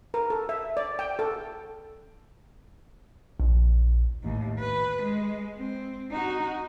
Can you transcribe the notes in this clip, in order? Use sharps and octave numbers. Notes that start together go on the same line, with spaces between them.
A#4
A4
E5
D5
G5
A4
A#1
D#2 A2
B4
G#3
C4
D#4 F#4